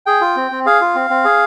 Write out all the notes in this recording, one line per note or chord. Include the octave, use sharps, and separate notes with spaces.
G#4 G5
F4
C4
C4
G#4 F5
F4
C4
C4
G#4